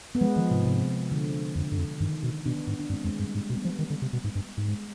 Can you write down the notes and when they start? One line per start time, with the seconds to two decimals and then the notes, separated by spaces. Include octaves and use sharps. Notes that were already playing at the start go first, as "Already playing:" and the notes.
0.15 B3
0.21 F3 G#3
0.36 D#3 F3
0.51 G#2 C3
0.66 C3
1.11 D3
1.56 F2 D3
1.72 G2
1.78 F2
2.00 G2 D#3
2.23 B2
2.45 B2 B3 D4
2.67 G#2
2.80 D4
2.90 G2 G#3 C4
3.04 F2 G#3
3.19 G2 G3
3.35 G#2 G#3
3.50 B2
3.57 G3 B3
3.65 F3
3.79 D#3
3.90 D3
4.02 C3
4.13 B2
4.24 G#2
4.35 G2
4.58 G#2
4.68 G#3